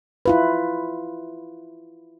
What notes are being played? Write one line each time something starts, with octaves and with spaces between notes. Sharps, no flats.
E4 F4 B4